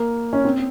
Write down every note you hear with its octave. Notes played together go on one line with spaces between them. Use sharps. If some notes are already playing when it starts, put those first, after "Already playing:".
Already playing: A#3
C#4
C4